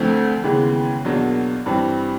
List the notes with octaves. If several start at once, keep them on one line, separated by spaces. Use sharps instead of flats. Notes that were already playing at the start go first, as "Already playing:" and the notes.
Already playing: D2 D3 F3 A3 C4
D#2 C#3 E3 G#3 B3
E2 B2 F#3 A#3 D4
G2 E3 G3 C4